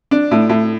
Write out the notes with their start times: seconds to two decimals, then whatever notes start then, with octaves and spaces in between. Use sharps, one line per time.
0.11 D4
0.31 A2
0.49 A2